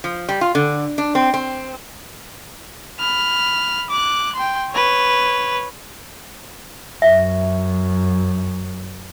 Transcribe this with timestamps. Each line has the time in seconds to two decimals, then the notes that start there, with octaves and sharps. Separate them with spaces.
0.04 F3
0.29 G3
0.41 F4
0.55 D3
0.98 D4
1.15 C4
1.34 C4
3.00 B5 F6
3.90 D6 F#6
4.36 G5 C6
4.73 B4 C#5
7.02 F#2 E5